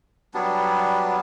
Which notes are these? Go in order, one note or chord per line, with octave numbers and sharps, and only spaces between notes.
F#3 G3 B3 D4